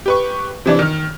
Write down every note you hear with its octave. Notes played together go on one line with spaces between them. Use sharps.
G4 B4 C#6
C3 E3 D4
D#3 F6